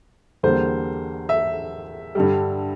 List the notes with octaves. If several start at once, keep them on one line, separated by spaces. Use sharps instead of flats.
E2 D3 G3 A#3 C5
E5
G2 D3 G3